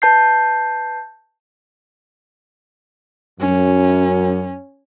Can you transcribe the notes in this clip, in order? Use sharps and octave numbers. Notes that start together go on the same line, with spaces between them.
B4 A5 G6 C7
F#2 C#4